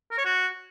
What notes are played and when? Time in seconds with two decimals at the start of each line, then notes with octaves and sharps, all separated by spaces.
0.11 A#4
0.18 C#5
0.25 F#4